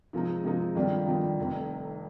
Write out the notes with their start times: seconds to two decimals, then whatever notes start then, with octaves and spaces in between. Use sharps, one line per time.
0.13 C3 F3 G#3 D#4
0.44 C3 F3 G#3 D#4
0.75 F2 D#3 G3 D4 F4
1.06 F2 D#3 G3 D4 F4
1.39 F1 F2 C3 D#3